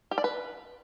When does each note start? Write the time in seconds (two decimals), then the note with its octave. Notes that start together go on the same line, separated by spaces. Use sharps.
0.11 G4
0.18 D5
0.24 B4